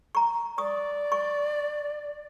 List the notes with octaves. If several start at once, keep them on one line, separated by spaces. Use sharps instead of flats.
A#5 C#6
D5 C#6 D#6
C#6